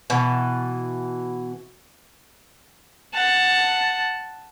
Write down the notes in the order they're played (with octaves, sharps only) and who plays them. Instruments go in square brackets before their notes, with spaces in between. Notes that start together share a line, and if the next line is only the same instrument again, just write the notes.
[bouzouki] B2 E3
[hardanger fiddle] F#5 A5